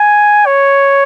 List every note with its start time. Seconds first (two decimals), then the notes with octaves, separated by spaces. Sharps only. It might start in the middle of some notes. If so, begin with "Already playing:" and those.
Already playing: G#5
0.46 C#5